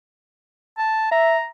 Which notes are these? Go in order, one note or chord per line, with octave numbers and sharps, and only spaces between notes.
A5
E5 A#5